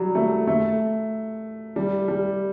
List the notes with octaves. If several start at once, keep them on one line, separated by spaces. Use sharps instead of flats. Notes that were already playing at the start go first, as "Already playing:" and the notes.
Already playing: F#3 G3
A3
A3
G3
G3